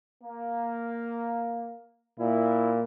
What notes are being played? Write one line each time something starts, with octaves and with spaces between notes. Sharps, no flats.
A#3
A#2 E4